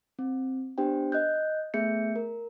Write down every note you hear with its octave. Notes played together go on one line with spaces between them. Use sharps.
C4
B3 D4 G4 C5 G5
D#5 F#6 G6
A3 B3 G#4 E5 G6 C#7
A#4